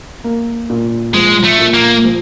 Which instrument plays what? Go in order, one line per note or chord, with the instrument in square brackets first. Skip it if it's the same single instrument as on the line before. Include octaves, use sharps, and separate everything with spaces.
[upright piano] A#3
A#2
[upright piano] F3 [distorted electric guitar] G#3
[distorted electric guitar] A3
[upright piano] A#2
[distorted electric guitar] A#3
[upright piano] F3